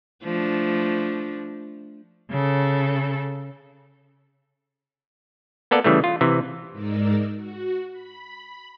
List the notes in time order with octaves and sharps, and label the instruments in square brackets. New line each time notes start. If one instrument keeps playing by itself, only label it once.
[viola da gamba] F3 A3 D4
[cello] C#3 A4
[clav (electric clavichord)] A#3 B3 A4 D5
C#3 E3 G3 A3
F4
C3 E3
[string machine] G#2 G#3 D#4 A#4 D5 E6
F#4
B5